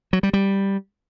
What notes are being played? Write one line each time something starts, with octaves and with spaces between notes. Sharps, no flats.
F#3
G3
G3